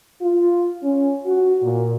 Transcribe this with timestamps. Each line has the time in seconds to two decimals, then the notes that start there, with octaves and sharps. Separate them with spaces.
0.21 F4
0.83 C#4
1.25 F#4
1.61 A#2